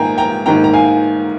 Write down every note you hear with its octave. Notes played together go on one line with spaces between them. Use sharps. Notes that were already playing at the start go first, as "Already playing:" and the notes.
Already playing: G#2 D#3 A#3 G5 G#5 A#5
G5 A#5
G#2 D#3 A#3 G5 A#5
A#5
F5 G#5